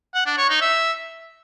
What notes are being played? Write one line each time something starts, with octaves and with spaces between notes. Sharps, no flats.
F#5
D4
C#5
D#4
E5